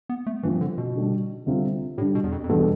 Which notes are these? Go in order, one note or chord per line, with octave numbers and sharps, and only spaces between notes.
B3
A3
G2 E3 F3 C4
D3
B2
D3 G3 D4
D2 C3 G3 C4 F4
A2 D3 G3 D4 G4
B2
E2
F2
F2
E2 G2 B2 G3 D4 A4